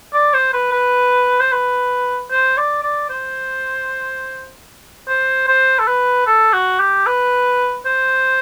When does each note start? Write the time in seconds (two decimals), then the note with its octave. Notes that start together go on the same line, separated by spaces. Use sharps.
0.14 D5
0.34 C5
0.53 B4
0.72 B4
1.40 C5
1.52 B4
2.31 C5
2.57 D5
2.83 D5
3.10 C5
5.08 C5
5.48 C5
5.79 A4
5.88 B4
6.27 A4
6.53 F#4
6.80 G4
7.07 B4
7.86 C5